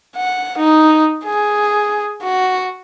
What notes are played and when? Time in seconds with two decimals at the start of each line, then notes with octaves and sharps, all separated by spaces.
0.16 F#5
0.58 D#4
1.25 G#4
2.23 F#4